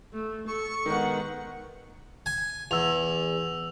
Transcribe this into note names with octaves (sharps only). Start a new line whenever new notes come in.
A3
A4 C#6
D#3 G#3 B3 F#5
G#5
E2 E6 F7